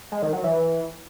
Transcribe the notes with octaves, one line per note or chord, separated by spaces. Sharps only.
G#3
D#3
F#3
E3